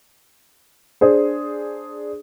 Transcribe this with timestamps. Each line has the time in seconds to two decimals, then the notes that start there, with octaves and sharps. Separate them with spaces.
1.01 D4 G#4 C5